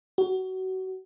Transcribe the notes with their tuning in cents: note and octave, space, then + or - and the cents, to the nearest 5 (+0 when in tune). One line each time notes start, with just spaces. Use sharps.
F#4 +25